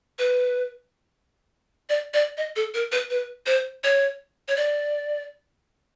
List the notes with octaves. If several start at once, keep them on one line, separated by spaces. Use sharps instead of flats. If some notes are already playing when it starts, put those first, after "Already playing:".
B4
D5
D5
D#5
A4
A#4
B4
B4
C5
C#5
C#5
D5